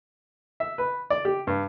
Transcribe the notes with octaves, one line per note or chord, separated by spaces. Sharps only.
E5
B4
D5
G4
G2